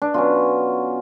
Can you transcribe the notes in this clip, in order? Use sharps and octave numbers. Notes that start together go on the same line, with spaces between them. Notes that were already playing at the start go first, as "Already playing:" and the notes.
D4
B2 F#3 C#4 F4